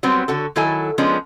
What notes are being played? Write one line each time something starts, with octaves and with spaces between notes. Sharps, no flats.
F#3 G3 B3 C4
D3 F#4 A4
D#3 F#3 E4 A4 G#5
F3 G#3 B3 C#4 D4